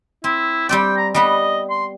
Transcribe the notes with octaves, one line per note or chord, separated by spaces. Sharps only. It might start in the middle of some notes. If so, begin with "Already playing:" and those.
C4 E4
G3 C4 D5 G5
A#5
G3 B3 B4 D#5
C6